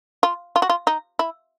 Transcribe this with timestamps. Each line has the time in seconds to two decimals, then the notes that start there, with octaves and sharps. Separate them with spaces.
0.23 F4
0.56 F4
0.62 F#4
0.70 F4
0.87 D#4
1.19 E4